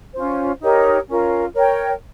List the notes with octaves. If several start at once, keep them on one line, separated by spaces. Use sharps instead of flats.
C#4 F4 C5
D#4 G4 A#4 C#5
C#4 F4 A#4
A#4 C#5 G5